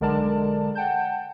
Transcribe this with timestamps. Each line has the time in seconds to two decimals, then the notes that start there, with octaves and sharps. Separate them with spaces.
0.01 B1 D3 G#3 A#4 D5 A5
0.75 F#5 G5 A5 G6